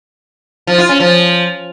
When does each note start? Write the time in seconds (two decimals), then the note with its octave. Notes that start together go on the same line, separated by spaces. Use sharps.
0.67 F3
0.78 F4
0.89 C#4
1.00 F3